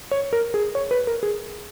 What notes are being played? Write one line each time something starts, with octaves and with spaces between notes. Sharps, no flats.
C#5
A#4
G#4
C#5
B4
A#4
G#4